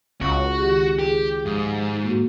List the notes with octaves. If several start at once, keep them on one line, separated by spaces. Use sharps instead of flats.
C#2 F#4
D#3 G4
G4 G#4
G#2 F3 D#6
A2 A#3 F#4